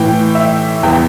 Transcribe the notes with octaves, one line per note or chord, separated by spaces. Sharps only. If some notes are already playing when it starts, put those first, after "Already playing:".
Already playing: A2 E3 G5
E5
E2 E3 G5